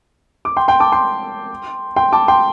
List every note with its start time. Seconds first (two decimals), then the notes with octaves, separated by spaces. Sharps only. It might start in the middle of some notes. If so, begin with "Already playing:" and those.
0.45 D6
0.57 G5 C6
0.68 G5 C6
0.80 A5 D6
0.92 G5 C6
1.96 G5 C6
2.12 A5 D6
2.28 G5 C6